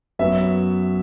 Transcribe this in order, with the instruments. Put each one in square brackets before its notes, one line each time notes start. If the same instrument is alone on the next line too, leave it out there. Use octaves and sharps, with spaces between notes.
[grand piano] F#2 F#3 B3 E5